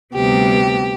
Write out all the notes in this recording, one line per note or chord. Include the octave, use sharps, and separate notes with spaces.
D2 C3 G3 B3 G4